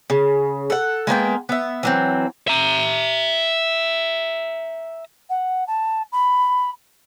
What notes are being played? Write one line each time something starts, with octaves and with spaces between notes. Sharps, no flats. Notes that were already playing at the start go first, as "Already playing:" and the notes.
C#3
A4 F#5
G#3 A#3 B3 G5
B3 E5
E3 F#3 C4
E5 A#5
F#5
A5
B5